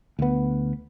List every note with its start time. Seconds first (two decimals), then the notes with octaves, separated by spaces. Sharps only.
0.19 D2 B3